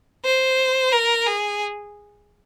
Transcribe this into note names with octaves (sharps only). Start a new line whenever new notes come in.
C5
A#4
G#4